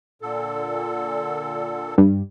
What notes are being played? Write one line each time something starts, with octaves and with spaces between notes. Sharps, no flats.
A#2 D3 A4
G2